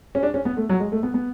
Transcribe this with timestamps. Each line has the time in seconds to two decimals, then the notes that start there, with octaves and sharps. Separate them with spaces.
0.15 C#4
0.23 D4
0.34 C#4
0.45 B3
0.57 A3
0.69 F#3
0.80 G#3
0.92 A3
1.03 B3
1.14 B3